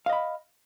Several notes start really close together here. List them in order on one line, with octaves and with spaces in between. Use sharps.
F5 D#5 B5